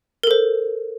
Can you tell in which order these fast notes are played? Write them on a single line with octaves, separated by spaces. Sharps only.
A#4 A4 C5